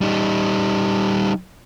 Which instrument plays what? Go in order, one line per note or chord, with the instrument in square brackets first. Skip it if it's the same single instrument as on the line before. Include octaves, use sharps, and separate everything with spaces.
[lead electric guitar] G3 D#4